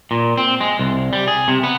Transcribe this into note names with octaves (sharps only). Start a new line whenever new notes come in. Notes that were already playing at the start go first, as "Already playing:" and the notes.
A#2
C4
G#3
C2
G3
G#4
C3
B3